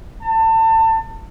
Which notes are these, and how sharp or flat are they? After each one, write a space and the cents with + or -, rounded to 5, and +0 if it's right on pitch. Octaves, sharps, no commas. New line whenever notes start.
A5 +30